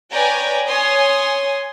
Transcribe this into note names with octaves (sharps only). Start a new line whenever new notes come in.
B4 C#5 D5 G5 G#5 A#5
C#5 G#5 C6 D#6